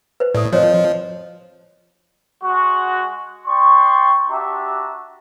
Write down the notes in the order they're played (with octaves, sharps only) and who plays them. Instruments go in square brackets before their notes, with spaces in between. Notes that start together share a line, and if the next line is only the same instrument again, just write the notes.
[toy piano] B4 C5
[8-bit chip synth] A2 [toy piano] A4 D5
[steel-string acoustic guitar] F2 [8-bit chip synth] F3 [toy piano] C5 C#5
[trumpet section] G#3 F#4
D5 G5 C6 C#6
D4 F#4 G4 E5 A#5